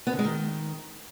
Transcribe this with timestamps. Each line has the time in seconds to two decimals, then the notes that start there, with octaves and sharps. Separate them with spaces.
0.07 B3
0.13 D3
0.19 G#3
0.25 D#3